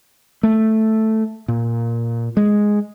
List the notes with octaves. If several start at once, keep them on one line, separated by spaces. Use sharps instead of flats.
A3
A#2
G#3